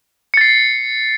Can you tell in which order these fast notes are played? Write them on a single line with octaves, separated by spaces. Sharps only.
C#7 A6 C7